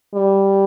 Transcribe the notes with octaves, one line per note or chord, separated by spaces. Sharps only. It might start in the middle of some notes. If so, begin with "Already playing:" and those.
G3